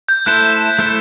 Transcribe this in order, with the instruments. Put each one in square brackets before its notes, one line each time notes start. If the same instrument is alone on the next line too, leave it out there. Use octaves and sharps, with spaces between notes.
[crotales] G6
[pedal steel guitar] A3 E4 A4 C5 [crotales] F#6
[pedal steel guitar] A3 E4 A4 C5